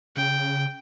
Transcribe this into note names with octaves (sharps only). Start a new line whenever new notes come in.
C#3 G5